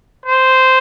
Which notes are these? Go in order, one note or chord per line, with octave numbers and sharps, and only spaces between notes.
C5